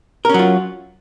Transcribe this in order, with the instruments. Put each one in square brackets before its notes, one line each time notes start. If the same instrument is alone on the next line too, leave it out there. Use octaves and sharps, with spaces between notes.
[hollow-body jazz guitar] A#4
C#4
F#3
F4